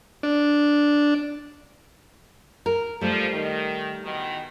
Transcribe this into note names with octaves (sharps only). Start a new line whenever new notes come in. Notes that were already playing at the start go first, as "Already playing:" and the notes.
D4
A#4
F3 G3 A3
D#3
E2 B2 D#3